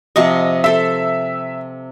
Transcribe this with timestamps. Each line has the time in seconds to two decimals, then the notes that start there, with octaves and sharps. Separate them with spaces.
0.16 C3 F3 D#5 C#6
0.64 A4 C5 E5